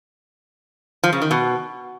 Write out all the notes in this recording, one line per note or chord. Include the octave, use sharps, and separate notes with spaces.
F3
C#3
D#3
B2